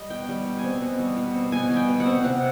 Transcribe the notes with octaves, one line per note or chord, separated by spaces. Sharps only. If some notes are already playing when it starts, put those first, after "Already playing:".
Already playing: G3 D#5
B2 G5
G3
B2
G#5
C4
B2
G3
B2
C4
B2 G#5
G3
G5
B2
F#5
C4
C3 F#5